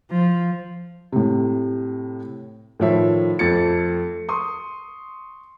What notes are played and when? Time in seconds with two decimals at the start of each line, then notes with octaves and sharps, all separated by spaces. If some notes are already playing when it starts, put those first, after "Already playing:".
0.11 F3
1.12 A2 C3
2.80 A2 D#3 F3 C#5 E5
3.39 F2 A3 A6 C#7
4.29 C6 C#6 D#6